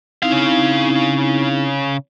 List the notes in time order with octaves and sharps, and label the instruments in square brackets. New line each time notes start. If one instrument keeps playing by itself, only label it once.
[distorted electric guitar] C#3 F5 [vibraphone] C4 D#4 E4